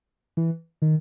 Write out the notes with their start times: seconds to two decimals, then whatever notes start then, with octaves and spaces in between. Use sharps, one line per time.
0.37 E3
0.82 D#3